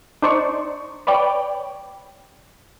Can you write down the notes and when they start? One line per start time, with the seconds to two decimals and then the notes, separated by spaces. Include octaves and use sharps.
0.22 D4 D#4 C5 D5 C#6
1.07 B4 C#5 D5 G5